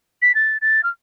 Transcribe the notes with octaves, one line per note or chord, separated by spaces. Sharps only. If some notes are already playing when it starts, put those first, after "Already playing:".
B6
A6
A6
F6